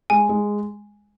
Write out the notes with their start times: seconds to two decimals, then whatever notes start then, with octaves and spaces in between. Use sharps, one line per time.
0.10 G#3 G#5
0.29 G#3